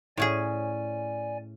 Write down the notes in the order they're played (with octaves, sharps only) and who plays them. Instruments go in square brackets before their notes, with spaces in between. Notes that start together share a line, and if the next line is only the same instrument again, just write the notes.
[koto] A2 C#4 G#4 [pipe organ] D5 G#5